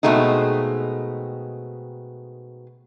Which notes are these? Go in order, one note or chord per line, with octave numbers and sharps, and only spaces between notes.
B2 G#3 A3 C4 D#4